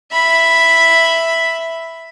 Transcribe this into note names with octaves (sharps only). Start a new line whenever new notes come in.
E5 B5